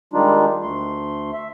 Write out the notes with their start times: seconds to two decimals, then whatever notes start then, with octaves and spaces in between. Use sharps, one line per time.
0.13 D#3 G3 G#3 D4 D#4 F4
0.63 D2 A3 C6
1.33 E5